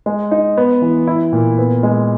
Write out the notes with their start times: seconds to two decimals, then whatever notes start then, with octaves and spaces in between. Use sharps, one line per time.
0.06 G#3
0.31 D#4
0.57 B3
0.82 E3
1.07 E4
1.32 A#2
1.58 B3
1.83 G#3